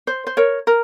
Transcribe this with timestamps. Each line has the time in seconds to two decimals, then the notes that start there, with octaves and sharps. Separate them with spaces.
0.07 C5
0.27 C5
0.37 A#4 C#5
0.67 A#4